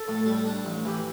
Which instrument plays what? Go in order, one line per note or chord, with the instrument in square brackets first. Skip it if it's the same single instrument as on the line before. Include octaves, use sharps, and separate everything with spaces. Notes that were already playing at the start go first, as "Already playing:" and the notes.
Already playing: [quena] A4
[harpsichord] A2
G3
D4
A1
[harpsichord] E3 [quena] G4